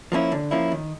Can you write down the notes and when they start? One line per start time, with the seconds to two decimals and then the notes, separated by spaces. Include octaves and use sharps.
0.12 F3 A#3 C#4 E4
0.32 D3
0.51 F3 A#3 C#4 E4
0.72 D#3